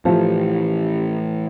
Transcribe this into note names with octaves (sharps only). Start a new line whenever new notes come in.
A2 E3 F3 G4